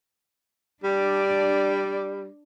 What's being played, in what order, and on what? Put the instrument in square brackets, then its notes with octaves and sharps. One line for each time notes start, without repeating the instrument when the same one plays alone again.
[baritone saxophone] G3 [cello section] D4 D5